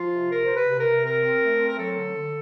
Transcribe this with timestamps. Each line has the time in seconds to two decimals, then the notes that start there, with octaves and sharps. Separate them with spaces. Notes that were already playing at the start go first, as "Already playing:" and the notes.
Already playing: F3 F4
0.12 C3
0.31 C3 A#4
0.44 C5
0.50 C3
0.56 B4
0.68 C3
0.80 A#4
0.87 C3
1.05 C4 A#4
1.24 C4
1.42 A3
1.61 C4
1.68 A#4
1.79 F#3 A4
1.98 D3
2.16 D3